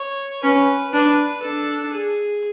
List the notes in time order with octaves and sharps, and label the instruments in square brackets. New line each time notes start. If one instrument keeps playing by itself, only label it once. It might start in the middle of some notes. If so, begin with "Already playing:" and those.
Already playing: [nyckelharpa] C#5
[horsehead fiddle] C#4 [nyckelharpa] B4
[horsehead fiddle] D4 [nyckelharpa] B4
[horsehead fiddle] D4 [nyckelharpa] A4
[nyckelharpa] G#4